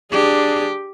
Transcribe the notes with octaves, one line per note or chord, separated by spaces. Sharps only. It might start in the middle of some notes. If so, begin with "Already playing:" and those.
D4 G4 G#4